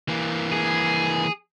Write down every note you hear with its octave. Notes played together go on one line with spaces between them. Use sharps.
E3 A#3
G#4